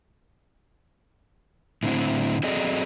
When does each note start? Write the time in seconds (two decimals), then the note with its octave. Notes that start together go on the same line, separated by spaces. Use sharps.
1.83 A2 D3 C4 E4
2.43 F#3 C4 G#4 A4 D5 D#5